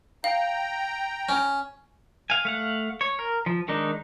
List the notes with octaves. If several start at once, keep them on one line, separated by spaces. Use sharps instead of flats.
F5 G5 A#5
C#4
F5 G#5
A3 F5 F#5
C#5
A#4
F3
D#3 G#3 D4 D#4